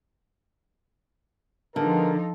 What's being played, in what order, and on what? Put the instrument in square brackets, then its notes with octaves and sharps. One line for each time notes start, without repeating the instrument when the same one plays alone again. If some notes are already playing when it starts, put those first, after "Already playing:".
[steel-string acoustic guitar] D3 [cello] F3 D#4 [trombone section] G#3 B3 A#4 [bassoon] A4